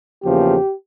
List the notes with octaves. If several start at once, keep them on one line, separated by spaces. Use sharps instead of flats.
E2 C#3 F3 A#3 G4